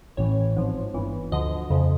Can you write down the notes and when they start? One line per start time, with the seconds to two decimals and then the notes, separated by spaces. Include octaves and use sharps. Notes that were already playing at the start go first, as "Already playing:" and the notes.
0.17 A1 A2 E3 C#5
0.56 G#1 G#2 F3
0.94 G1 G2 E3
1.32 D2 D3 F3 D#5
1.70 F2 C#3 F3